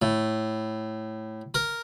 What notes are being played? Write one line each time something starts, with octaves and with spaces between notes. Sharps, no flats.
A2
A#4